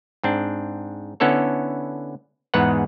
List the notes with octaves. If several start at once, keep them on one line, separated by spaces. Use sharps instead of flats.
G#2 C4 D4
D3 B3 C#4 E4 A4 C#5
E2 G#2 G#3 B3 B4 F#5